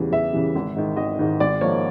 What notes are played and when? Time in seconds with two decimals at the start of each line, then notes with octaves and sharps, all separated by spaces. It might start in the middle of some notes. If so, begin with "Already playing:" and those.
Already playing: E2 C#3 E3 G3
0.12 E2 E5
0.33 C#3 E3 G3
0.55 G#1
0.76 G#2 D#3
0.97 G#1 D#5
1.19 G#2 D#3
1.40 G#1 D5
1.61 G#2 F3 A#3 C#5